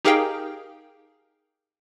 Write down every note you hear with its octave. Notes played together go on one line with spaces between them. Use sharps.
D#4 G4 G#4 A#4 F5 G5